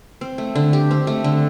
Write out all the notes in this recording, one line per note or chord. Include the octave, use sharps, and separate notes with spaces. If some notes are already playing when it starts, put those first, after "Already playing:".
C4
A3
D3
G4
C4
A3
D3